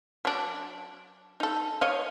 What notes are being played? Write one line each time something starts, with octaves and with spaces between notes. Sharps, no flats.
F#3 D4
D#4 A4
C#5 D#5 F5